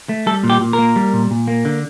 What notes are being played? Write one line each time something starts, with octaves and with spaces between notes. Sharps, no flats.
A3
G3 A4
A#2
G4
A#2
A#4
A#3
G3
A#2
A#2
A#3
D3